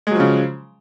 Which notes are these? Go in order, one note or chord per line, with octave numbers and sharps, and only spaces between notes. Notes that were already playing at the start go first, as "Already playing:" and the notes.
C#3 F3 F#3 G#3